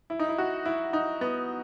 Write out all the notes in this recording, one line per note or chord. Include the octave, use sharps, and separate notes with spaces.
E4
D#4
E4
F#4
E4
D#4
B3